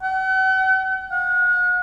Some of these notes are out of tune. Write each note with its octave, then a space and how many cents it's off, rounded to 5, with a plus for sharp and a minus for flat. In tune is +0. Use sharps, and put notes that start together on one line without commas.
F#5 +40
F#5 -35